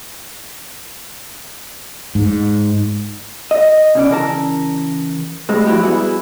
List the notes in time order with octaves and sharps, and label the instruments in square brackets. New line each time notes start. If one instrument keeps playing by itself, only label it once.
[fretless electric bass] G#2
[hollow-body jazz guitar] D#5
B2 C#4 D5
C#3 E3 A#4 A5
A2 G3 G#3 C4
F3 F#3 G#3 E4 F#4 G4
G3 B3 E4 F#4 G#4